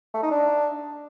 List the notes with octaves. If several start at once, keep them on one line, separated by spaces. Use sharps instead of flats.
A3
D#4
D4